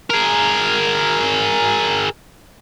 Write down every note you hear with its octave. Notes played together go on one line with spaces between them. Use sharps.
G#4 A#4